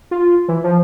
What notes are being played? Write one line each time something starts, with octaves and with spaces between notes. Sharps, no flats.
F4
E3
F3